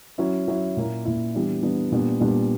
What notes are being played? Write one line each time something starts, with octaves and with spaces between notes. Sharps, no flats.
F#3 C#4 E4
F#3 C#4 E4
A#2 A#3 E4
A#2 A#3 E4
E3 G3 B3 D4
E3 G3 B3 D4
A#2 G3 B3 D4
A#2 G3 B3 D4